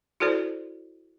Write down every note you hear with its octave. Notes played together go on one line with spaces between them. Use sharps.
E4 F#4 A4 C5 D5